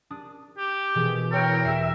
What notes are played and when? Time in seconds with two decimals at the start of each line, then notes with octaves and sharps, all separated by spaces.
0.10 D4 D#6
0.58 G4
0.95 B2 E3 B3 G#4
1.31 E4 A#4 C#5 G5
1.64 E2 E5 C7